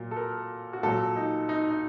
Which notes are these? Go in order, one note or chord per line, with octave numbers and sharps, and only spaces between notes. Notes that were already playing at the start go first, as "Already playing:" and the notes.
Already playing: A#2 F#3
A4
A#4
F#4
A#2 F#3 A4
D#4
D#4
D#4